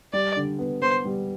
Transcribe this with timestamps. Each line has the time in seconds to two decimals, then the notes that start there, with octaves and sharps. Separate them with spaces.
0.13 G3 D5
0.36 D3
0.59 B3
0.82 B3 C5
1.05 G3